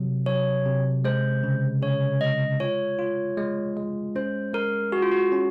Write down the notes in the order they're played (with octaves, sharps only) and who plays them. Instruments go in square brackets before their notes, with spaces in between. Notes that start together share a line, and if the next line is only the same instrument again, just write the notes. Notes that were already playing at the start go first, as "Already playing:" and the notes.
Already playing: [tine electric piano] C3 F#3
[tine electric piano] F#3 [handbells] C#5
[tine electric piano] C3
[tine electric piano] G#3 [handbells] C5
[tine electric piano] C#3
[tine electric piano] C#3 [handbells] C#5
[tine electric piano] G#3 [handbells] D#5
[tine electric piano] F4 [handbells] C#5
[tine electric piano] F4
G#3
G#3
[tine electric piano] C#4 [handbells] C5
[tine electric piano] G#3 [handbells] A#4
[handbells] F#4 [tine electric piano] G#4
[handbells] F4
F#4
[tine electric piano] C#4